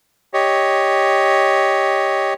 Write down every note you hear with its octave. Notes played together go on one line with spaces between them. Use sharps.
G4 C#5 D#5